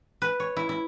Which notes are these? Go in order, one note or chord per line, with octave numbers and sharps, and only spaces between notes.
B4
C#5
E4
E4